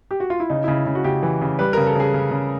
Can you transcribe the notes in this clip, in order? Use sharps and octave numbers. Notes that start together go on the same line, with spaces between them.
G4
F#4
F4
E4
C#3 D#4
C#3 E4
C#3
F#4
C#3 G4
E3
C#3
G3 B4
C#3 A#4
A4
C#3 G#4
C#3
C#3